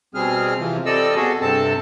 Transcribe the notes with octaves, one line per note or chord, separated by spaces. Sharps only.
B2 G3 C4 G#4 F6
C3 E3 F3
G3 C4 A4 D5 D#5 E6
B2 F#4 G#4 A4
G2 C3 C4 A4 A5